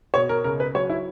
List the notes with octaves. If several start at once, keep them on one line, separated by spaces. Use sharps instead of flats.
B2 C#5
A#4
C#2 A#4
B4
F#3 C#5
E4